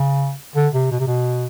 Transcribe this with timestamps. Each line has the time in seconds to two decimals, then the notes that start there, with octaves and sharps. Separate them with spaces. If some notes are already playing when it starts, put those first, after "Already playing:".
Already playing: C#3
0.56 D3
0.74 C3
0.91 B2
1.00 C3
1.07 B2